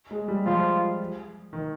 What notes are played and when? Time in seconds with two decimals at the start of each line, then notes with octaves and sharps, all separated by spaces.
0.11 G#3
0.28 G3
0.46 F3 F4
1.53 D#3